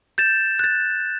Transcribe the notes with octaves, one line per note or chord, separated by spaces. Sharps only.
G6 A6 E7
F#6 A6